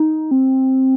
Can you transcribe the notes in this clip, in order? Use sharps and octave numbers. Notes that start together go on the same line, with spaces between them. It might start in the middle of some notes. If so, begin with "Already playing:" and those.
Already playing: D#4
C4